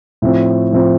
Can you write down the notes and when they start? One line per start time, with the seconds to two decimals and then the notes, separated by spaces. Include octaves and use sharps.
0.22 A2 F3 C4
0.72 A2 F3 C4